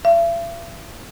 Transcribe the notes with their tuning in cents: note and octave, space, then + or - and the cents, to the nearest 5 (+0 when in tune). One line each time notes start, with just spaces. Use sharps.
E5 +45